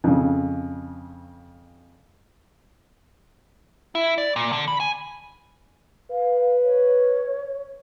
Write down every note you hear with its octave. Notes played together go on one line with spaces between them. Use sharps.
F2 C#3
E4
D5
A#2
D3
B5
G#5
B4 F5
C#5